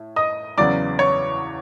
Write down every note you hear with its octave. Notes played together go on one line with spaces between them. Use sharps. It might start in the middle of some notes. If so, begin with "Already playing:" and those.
Already playing: A2
D#5 D#6
E2 C#3 F#3 B3 D5 D6
C#5 C#6